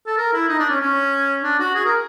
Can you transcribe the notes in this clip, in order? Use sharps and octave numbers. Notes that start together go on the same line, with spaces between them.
A4
A#4
E4
D#4
D4
C#4
C#4
D4
F#4
G#4
A#4